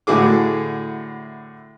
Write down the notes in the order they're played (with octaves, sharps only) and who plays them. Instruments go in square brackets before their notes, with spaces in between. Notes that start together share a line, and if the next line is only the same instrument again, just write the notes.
[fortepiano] A2 D3 E4 F#4 G#4 D6